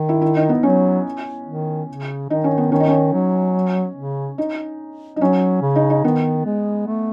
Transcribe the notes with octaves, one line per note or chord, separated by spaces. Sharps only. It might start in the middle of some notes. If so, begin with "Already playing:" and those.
Already playing: D#3
E4
E4
D#4
B3
F#3 C#4
D#3
C#3
D#3 D#4
C#4
B3
D#3 C#4
D#4
C#4
F#3
C#3
D#4
D#4
F#3 C#4
C#3
D#4
D#4
D#3 B3
G#3
A3